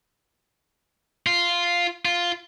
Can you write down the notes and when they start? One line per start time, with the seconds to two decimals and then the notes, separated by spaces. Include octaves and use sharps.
1.26 F4
2.05 F4